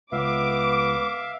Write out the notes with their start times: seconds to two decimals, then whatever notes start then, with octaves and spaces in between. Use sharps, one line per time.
0.12 C#2 B3 E5 F5 D6